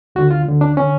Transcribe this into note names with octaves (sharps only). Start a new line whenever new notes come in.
D2 D3 F#4
F4
D2 D3
D4
D3 C#4